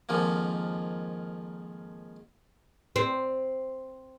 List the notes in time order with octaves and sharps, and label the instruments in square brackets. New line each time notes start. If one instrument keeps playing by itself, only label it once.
[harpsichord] F2 G#2 D#3 F3 A#3
[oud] C4